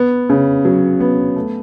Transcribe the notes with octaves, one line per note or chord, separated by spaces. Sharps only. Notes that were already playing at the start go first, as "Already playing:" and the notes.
Already playing: B3
C#3
F#3
B3
A3